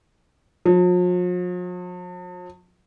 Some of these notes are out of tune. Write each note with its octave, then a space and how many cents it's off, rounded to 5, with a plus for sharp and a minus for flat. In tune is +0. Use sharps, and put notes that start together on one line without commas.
F3 +45